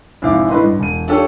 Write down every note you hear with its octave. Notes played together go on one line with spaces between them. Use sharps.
A#1 G#2 C3 E4 F5 D6
A2 D3 B4 D#5 C6
G2
E1 D#7
D4 F4 G4 A4 C#5